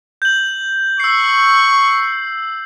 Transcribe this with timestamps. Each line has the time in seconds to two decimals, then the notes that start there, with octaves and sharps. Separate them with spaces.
0.22 G6 F#7
1.00 C#6 E6 C7